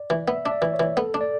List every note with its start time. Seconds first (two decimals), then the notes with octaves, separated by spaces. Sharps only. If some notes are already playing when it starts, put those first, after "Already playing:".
Already playing: D5
0.10 E3
0.28 B3 E5
0.45 D4 E5
0.51 D5
0.62 E3
0.74 C#5
0.79 E3
0.97 B3 A4
1.14 D4
1.21 D5